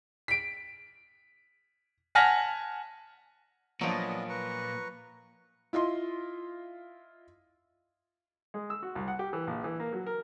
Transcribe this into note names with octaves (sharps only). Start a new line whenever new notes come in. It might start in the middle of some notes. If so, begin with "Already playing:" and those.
B6 D7
F#5 G#5 A5 F6 A#6 B6
A#2 F3 F#3 B3 D4 D#5
B4 A#5 C#6
E4 F4 D#5 C6
G#3
E6
F#4
C2
F#5
G4
E3
A#1
E3
A#3
F#3
A#4